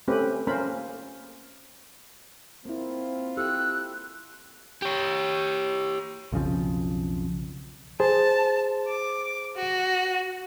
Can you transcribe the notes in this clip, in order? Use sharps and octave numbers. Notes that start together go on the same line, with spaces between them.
A3 C4 C#4 G4 B4
A#3 C#4 A#4 C5 B5
A#3 C4 E4 F4
E4 G4 A4 E6 F#6
G4 C#5
B1 F2 C#3 F3
G#4 C5 A5
D6
F#4